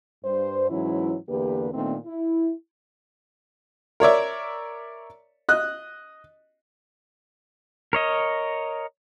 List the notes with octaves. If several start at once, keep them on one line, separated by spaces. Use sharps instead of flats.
G2 C5
G#2 E3 F#3 C#4 E4
E2 D3 A#3 G4 B4
A#2 D#3 A3 B3 C4 D4
E4
A#4 C#5 D5 E5
D#5 F#6
A#4 C#5 D#5